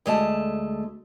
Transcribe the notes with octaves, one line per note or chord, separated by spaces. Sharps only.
D2 G#3 A3 A5